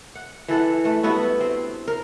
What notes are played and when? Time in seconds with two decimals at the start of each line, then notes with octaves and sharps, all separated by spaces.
0.15 F#5
0.48 E3 A4 F#5
0.84 A3 B4
1.03 G2 B3 E4 F#4
1.41 C4
1.88 A#4